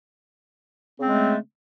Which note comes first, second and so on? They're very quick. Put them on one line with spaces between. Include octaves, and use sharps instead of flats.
C#3 C4 G#3 A3